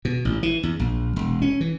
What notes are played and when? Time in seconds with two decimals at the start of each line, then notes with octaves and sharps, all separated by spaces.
0.05 B2
0.25 A1
0.43 E3
0.63 E2
0.79 A#1
1.16 E1
1.42 C#4
1.61 E3